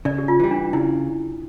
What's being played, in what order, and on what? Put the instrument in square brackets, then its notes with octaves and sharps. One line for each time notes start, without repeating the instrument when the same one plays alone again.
[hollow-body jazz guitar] C#3 [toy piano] D5
[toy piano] G4
F4
[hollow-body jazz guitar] E3 G3
[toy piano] D4
[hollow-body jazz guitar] C#3 [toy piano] E4